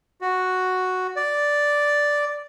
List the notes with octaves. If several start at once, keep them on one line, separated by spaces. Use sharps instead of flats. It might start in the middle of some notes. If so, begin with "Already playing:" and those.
F#4
D5